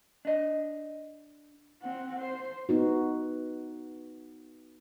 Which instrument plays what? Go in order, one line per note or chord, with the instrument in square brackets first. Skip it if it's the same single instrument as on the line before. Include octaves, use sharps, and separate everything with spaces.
[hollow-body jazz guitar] D4 D#5
[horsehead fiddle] C4 F#5
C5
[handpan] B3 D#4 F#4